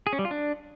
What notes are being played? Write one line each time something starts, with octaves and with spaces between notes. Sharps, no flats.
G#4
C#4
G3
F4
D4